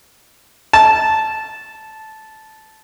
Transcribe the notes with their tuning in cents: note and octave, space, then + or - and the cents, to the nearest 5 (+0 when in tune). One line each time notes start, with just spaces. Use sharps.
A5 -10